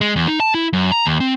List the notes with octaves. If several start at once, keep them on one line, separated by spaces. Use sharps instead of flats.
G#3
E2
D#4
A5
E4
F#2
A#5
D#2
C4